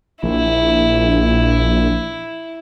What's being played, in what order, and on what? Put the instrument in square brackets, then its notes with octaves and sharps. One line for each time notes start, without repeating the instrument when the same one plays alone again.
[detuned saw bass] A#1 [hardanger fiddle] E4